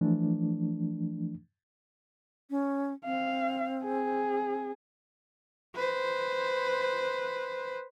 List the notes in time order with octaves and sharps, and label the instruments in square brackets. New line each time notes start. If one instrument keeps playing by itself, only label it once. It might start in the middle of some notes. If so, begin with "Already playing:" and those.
[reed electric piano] E3 F3 A3 D4
[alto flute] C#4
[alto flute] C4 [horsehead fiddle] F5
[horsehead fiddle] G#4
B4 C5